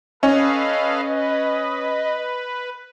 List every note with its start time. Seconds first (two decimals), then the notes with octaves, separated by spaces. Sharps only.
0.23 C#4 A4 B4 D#5 F5
1.07 B4